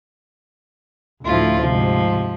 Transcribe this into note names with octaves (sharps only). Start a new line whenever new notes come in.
D2 A2 F3 E4 F4
G#2 C3 F3